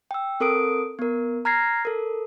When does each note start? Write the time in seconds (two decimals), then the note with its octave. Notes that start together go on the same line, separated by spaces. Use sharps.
0.11 G5 E6
0.40 C4 A4 A#4 D#6 D7
0.99 B3 A#4
1.45 A#5 F6 G#6 A#6 C7
1.85 A4 A#4